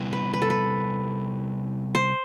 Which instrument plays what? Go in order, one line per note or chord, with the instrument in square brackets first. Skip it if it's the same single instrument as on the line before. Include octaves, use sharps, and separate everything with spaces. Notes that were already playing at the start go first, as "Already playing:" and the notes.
Already playing: [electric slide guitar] C3 G3 B3 E4
[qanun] B4
B4
A4
B4
C5